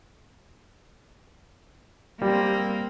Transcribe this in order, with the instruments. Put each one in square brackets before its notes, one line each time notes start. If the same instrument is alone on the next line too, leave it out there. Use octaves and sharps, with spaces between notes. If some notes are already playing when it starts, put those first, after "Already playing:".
[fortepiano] G3 [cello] A#3 C4